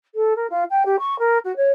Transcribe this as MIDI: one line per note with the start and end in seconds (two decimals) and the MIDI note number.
0.15 0.33 69
0.36 0.47 70
0.50 0.64 65
0.70 0.83 79
0.85 0.96 67
0.99 1.17 85
1.19 1.38 70
1.44 1.55 66
1.56 1.71 73